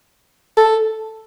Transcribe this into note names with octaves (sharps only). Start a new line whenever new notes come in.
A4